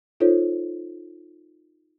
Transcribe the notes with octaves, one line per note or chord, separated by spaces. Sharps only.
D#4 F4 A4 C5 C#5